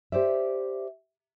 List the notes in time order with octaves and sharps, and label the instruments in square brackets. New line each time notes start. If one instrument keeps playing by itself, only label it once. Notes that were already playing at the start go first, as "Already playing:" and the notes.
[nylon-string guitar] G4 C5 D5 E5